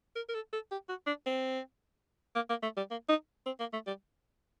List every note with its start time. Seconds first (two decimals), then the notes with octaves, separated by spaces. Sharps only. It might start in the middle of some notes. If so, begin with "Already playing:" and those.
0.16 A#4
0.29 A#4
0.35 A4
0.53 A4
0.71 G4
0.89 F#4
1.07 D4
1.26 C4
2.35 A#3
2.50 A#3
2.63 A3
2.77 G3
2.91 A#3
3.09 D#4
3.46 C4
3.60 A#3
3.73 A3
3.87 G3